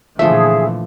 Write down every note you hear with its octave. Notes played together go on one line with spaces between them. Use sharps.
A#2 D3 E3 F3 A3 G#4 E5